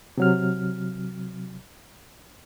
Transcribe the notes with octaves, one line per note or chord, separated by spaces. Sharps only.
C3 F#3 F6